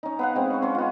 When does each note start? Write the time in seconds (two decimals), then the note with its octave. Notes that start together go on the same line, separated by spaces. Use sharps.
0.03 C#4 D#4
0.19 B3 F5 F#5
0.35 G#3 C4
0.50 C#4 C#6
0.62 C#4 C6
0.75 B3 F4